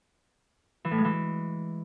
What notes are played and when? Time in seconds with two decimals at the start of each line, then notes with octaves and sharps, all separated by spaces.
0.85 E3
0.91 A2
0.98 G#3
1.04 E3